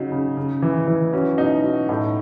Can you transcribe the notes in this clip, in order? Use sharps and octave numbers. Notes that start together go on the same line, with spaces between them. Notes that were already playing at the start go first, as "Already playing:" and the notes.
Already playing: C#3 F#3 D#4
C#3
C#3
E3
E3
F#3 C#4
B2 D#4
F#3
A2 D#4